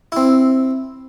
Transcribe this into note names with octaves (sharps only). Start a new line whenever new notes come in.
C4 E4